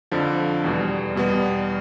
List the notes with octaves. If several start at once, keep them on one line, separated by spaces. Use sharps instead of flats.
F2 D3 F3
E2 B2 G3
E2 B2 G3 B3